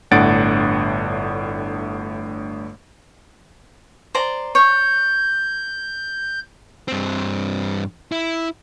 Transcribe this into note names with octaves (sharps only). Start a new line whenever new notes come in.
G1 A2 D4 F#5 A6 D7
C5 D5 A#5
C#5 G6
G2 C4
E4